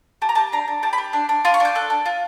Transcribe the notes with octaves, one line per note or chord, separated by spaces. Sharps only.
G4 A5
A#5
G4 A5
D4 A#5
D4
G4 A5
B5
G4
D4
D4
F4 C6
C#6
D4 G6
A4 F#6
D4
F4